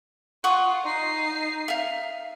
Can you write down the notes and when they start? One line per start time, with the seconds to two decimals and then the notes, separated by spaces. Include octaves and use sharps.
0.44 F4 F#5 C#6 D#6
0.83 D#4 C7
1.68 E5 F5